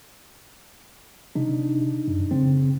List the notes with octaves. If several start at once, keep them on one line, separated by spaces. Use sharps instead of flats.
C3 D4 D#4
F#2
C#3 C4